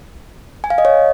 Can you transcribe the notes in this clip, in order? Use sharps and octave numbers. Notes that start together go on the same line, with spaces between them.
G#5
F5
D#5
C#5